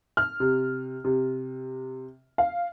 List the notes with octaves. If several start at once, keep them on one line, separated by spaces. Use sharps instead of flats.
F6
C3
C3
F5